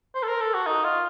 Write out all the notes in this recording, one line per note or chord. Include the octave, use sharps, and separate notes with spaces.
C5
A4
A#4
A4
F#4
D#4
F4